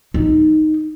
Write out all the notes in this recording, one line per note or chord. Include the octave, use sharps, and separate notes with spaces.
D#4